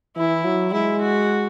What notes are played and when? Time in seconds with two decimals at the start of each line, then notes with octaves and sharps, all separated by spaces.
0.16 E3 E4
0.44 F#3
0.73 G#3 E4
1.02 F#4